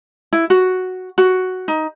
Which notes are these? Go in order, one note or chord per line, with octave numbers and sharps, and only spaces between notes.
E4
F#4
F#4
D#4